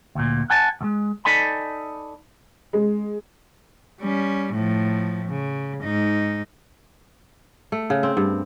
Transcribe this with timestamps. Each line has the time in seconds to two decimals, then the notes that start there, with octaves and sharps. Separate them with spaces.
0.15 D2 A#2
0.50 F#5 G#5 A5
0.81 D2 G#3
1.25 D#4 A4 D5 G#5 B5
2.73 G#3
4.01 G3 C#4
4.53 A2 F3
5.29 C#3
5.83 G#2 D#4
7.72 A3
7.90 C#3
8.03 C4
8.17 G2